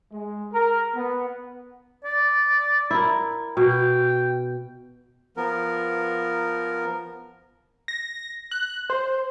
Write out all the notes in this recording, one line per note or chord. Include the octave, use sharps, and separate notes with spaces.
G#3
A#4
B3
D5
E4 A#4
B2 G5
F3 B3 A#4
A#6
F#6
C5